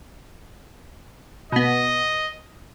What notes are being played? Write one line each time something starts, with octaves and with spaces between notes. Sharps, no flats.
B2 B3 D#5